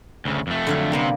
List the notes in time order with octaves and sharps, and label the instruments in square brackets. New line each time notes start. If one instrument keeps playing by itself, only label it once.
[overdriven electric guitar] D2 C#3
F2 A3
[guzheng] D3 F#3 F5
[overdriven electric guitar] C3 [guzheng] G3 A#3 B3